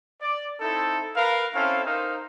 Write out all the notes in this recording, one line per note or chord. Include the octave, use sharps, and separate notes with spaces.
D5
C4 D#4 E4 A4
A#4 B4 F5
C4 C#4 E4 A4 F5
D#4 A#4 C5 F5